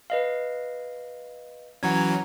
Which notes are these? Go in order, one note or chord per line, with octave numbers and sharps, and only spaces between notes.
B4 D#5 F5
E3 F#3 C#4 F#5 A#5 G#6